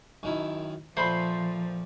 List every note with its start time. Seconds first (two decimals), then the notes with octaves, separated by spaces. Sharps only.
0.23 F#2 D#3 E4
0.97 A#2 F3 A3 C5 B5 C6